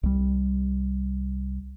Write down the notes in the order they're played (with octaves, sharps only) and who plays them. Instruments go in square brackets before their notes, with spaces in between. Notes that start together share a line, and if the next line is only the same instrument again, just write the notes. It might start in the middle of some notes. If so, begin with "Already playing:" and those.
[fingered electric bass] C2 G3